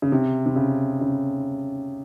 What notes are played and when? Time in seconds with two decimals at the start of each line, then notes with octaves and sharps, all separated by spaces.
0.02 C#3
0.12 C3
0.46 C3
0.56 C#3
1.01 C#3